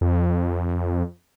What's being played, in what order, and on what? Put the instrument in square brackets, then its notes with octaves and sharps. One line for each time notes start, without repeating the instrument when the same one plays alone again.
[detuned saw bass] F2